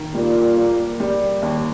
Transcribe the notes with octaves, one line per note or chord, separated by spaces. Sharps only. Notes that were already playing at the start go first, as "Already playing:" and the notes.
Already playing: D#3 A#3
A#2 G3
A#3
G3
D#2